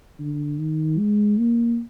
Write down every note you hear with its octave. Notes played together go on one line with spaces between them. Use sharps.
D3
D#3
G#3
A#3